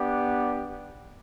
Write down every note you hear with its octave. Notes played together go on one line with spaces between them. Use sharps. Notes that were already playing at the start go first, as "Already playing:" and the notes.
Already playing: B3 D4 G4